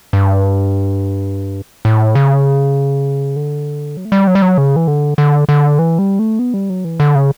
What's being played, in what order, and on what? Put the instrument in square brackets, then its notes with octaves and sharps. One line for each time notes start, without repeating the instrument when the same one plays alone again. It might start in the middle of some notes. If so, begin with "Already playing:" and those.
[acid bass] G2
A2
C#3
D3
F#3
A3
G3
F#3
G3
F#3
C#3
E3
D3
D3
D3
E3
G3
A3
B3
G3
F#3
E3
D3
C#3